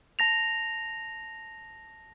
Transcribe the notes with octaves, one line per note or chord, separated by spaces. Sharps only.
A5 A#6 F7